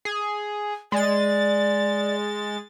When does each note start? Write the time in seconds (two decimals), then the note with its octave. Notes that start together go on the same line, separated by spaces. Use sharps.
0.05 G#4
0.92 G#3 D5 A6